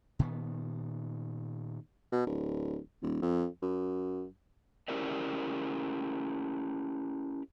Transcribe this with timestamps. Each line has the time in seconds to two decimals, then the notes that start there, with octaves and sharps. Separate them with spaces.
0.19 A#2 D#3 B3
2.12 B2
2.26 D1
3.02 D#1
3.22 F2
3.62 F#2
4.88 C#4 E4 G4 A#4 C5 D5